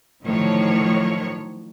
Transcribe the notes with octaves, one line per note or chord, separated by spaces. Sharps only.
A2 D3 D#3 F3 F#3 C#5